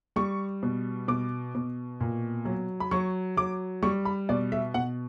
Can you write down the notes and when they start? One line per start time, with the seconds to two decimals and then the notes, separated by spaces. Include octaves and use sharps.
0.16 G3 C#6
0.63 B2
1.08 B2 D6
1.55 B2
2.00 A#2
2.45 F#3
2.80 B5
2.91 F#3 C#6
3.37 F#3 D6
3.83 G3 C#6
4.05 B5
4.29 B2 D5
4.52 E5
4.74 B2 F#5